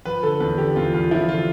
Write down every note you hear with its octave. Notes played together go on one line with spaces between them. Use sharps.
F3 B4
D3 A4
E2 B4
D3 G4
E2 F4
E2 F4
F3 E4
D3 F4